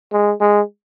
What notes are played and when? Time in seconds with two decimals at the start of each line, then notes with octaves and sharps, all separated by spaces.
0.12 G#3
0.41 G#3